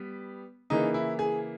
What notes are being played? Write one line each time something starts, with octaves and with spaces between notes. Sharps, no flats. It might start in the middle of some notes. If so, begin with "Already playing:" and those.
Already playing: G3 B3
C#3 E3 A#3 D#4
E4
G#4